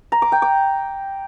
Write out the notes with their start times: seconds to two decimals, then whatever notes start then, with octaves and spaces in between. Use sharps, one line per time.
0.12 A#5
0.22 D6
0.32 G5
0.42 D6